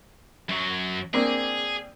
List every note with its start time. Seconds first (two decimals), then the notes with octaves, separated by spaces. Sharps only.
0.49 F#2 F#3
1.14 A#3 C4 D4 G#4